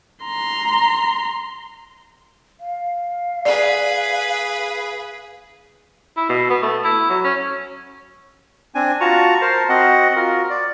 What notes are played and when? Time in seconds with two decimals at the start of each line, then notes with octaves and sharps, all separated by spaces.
0.25 A#5 C6
2.60 F5
3.45 G#4 B4 D5
6.17 E4
6.29 B2
6.50 B3
6.62 A3
6.84 E4
7.09 F#3
7.24 C#4
8.75 C4 D4 G#5
9.01 F4 F#4 A5 A#5 C#6
9.41 A#4 C5 A5
9.69 C4 F#4 D#5 F#5
10.16 F4 F#4 A#4
10.50 D5